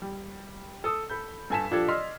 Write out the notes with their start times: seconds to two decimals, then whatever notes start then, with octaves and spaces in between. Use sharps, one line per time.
0.02 G3
0.84 A4 D#6 E6
1.10 A4 B5 G6
1.50 G2 A4 G#5 A5 B6 E7
1.71 A#2 F3 D4 G4 A4 G#6
1.88 D5 D#5 C6 E6 F6 B6